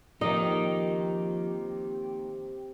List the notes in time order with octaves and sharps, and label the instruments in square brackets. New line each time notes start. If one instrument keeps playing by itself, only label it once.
[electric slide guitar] D#3 A#3 D#4 [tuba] F3 [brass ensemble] C4 G4 [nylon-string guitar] D#5